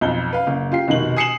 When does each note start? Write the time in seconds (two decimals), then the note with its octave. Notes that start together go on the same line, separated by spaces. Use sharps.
0.01 B1 F2 G7
0.33 B4 F5
0.47 F#1
0.72 F4 G4 C7
0.88 F1 B2 D#3 F#7
1.17 G#5 D#6 C7 C#7 E7 F#7